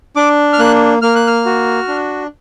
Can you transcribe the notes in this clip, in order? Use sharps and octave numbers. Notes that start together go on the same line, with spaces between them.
D4 D6
F6
A#3 F#6
A#3 F6
F#6
F6
F#4
D4